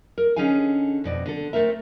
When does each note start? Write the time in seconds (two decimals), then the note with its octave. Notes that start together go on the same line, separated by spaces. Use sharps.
0.18 A#4
0.36 D3 C#4 D#4 G#4 F5 G#5
1.04 F2 B2 D5
1.26 D3 A4
1.53 A3 A#3 C4 A#4 E5